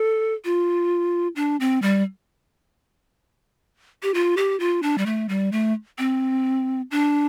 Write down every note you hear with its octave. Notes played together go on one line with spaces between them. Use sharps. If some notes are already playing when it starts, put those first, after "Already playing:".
Already playing: A4
F4
D4
C4
G3
G4
F4
G4
F4
D4
G3
A3
G3
A3
C4
D4